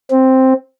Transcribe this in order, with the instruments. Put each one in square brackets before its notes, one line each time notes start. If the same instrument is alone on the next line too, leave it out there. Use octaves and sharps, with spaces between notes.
[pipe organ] C4